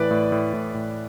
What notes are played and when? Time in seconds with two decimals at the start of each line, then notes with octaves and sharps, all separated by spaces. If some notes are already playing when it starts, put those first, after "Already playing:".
Already playing: A2 E3 B4 D5
0.11 A2
0.32 A2
0.53 A2
0.74 A2